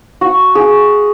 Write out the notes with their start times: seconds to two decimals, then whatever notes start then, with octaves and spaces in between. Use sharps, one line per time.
0.21 F#4
0.55 G#4